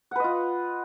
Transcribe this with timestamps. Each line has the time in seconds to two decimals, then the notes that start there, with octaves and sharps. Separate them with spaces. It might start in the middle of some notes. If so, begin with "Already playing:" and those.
0.11 F#5
0.16 B4
0.20 D#5
0.24 F4